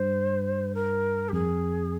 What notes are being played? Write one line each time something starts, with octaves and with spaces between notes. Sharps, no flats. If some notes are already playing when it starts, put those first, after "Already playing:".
Already playing: G2 C5
A#4
G4
F2 G#4